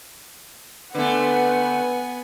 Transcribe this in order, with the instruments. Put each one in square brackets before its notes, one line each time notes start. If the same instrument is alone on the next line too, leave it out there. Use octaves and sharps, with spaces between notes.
[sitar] D3 A3 [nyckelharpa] B3 G#5 [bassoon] B4 [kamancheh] F#5